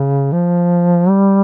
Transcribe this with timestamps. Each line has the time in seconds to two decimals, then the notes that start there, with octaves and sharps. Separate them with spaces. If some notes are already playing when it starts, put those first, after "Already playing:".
Already playing: C#3
0.32 F3
1.09 G3